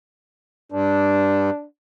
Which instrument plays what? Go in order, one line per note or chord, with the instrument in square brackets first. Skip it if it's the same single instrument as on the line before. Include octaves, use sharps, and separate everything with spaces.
[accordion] G2 [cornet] D4